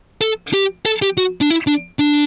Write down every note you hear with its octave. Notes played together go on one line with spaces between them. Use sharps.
A4
G4
A4
G4
F#4
D4
E4
D4
D4